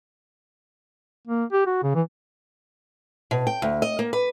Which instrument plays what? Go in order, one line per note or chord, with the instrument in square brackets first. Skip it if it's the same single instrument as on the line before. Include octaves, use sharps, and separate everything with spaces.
[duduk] A#3
G4
F#4
C#3
E3
[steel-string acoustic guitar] B2
G5
D2
D#5
A#3
B4